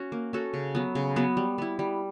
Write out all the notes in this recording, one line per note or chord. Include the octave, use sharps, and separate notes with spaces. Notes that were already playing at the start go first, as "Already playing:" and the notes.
Already playing: C#4 F#4
A#3
C#4 F#4 A4
C#3
F#3 B3
C#3
F#3 B3
G3
B3 E4
G3